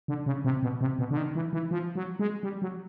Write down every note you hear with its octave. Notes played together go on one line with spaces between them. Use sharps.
D3
C#3
C3
B2
C3
B2
D3
D#3
E3
E3
F3
F#3
G#3
G3
F#3